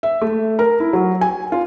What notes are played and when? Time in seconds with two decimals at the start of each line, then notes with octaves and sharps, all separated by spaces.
0.03 E5
0.22 A3
0.59 A#4
0.80 E4
0.93 F#3
1.21 G#5
1.52 F4